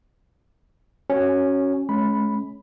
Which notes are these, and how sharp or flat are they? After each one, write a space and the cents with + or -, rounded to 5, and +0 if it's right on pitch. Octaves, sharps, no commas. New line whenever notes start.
C#4 -5 F#4 +10
G#3 +40 C#4 +0 B5 +0